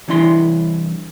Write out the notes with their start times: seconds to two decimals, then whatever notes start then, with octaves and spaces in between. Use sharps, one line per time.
0.08 C2 E3 D4 E4 C6